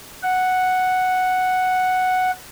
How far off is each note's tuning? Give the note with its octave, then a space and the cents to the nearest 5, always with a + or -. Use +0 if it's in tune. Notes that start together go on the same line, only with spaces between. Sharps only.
F#5 +0